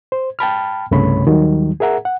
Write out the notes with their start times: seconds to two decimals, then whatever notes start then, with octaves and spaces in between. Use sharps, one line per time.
0.12 C5
0.39 G5 A5 B5 F6
0.91 C2 G2 C#3 A3 C#5 B5
1.26 D#2 D#3 F#3 G3
1.80 G#4 A#4 E5 F#5 A#5
2.05 F#5